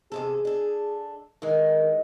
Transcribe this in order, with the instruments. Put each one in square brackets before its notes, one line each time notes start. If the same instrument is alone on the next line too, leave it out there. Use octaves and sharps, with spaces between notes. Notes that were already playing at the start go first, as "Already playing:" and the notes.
[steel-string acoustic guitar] E2 C3 A4 [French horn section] G#4
[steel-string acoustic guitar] D4 A4
[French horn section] D#3 A#4 [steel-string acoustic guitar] E3 G#3